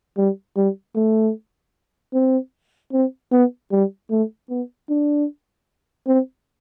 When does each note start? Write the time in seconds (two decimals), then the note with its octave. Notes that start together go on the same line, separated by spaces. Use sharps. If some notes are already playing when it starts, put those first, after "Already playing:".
0.17 G3
0.57 G3
0.96 A3
2.14 C4
2.93 C4
3.32 B3
3.72 G3
4.11 A3
4.50 B3
4.89 D4
6.07 C4